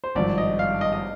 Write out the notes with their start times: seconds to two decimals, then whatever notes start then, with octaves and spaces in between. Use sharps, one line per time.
0.04 C5
0.15 G#1 G2 F3 D5
0.38 D#5
0.59 F5
0.81 D#5
0.92 D#5